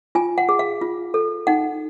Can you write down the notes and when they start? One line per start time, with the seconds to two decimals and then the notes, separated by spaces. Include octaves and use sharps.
0.15 F4 G#5
0.38 F#5
0.49 G#4
0.59 F5
0.81 F4
1.14 A4
1.47 D#4 F#5